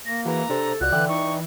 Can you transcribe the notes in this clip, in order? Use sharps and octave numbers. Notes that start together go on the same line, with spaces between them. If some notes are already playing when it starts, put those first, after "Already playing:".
A#3 A#6
E3 F#4 G#4 B4 A#5
C3 D4 G4 A4 C5
C#2 F4 F#4 D5 F#6
D3 E3 D5 E5 G5
D#4 C#6